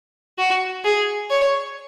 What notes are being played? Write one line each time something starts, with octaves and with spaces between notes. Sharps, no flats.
F#4
G#4
C#5